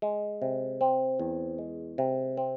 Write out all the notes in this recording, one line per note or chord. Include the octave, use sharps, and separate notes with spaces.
G#3
C3
C4
E2
G#3
C3
C4